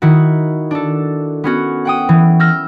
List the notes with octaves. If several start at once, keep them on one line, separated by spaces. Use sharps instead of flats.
D#3 E4 F#4
D4 A4
B3 C#4 F#4
F#5 G5 D#6
E3
E6 F6 G6 A#6